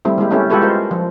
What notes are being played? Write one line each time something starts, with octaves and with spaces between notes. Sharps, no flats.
G3 A3 C4 E4
G#3 A#3 E4 G4
A3 B3 C#4 E4 G4 A4
G#3 F4 G4 A4 B4 C#5
G#3 F4 A#4 C5
F3